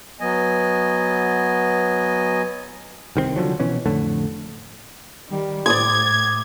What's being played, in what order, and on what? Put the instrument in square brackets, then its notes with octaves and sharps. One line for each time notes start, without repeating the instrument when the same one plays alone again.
[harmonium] F#3 B3 D#5 G#5
[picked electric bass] C2 D#3 G#3 C4
C2 D3 F3 F#3
B2 E3 C#4
F2 A2 D3 A3
[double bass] D#3 G3
[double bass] A2 [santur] D5 D6 D#6 [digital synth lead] G#6